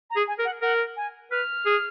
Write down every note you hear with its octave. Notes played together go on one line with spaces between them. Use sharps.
A#5
G#4
G#5
A#4
F#5
A#4 F#5
G#5
B4 F6
G#4